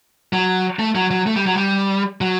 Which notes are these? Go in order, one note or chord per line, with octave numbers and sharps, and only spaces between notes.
F#3
A3
F#3
F#3
A3
G3
F#3
G3
F#3